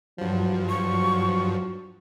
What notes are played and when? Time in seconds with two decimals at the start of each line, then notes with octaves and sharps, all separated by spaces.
0.18 G2 F3 F#3
0.69 F#3 C#6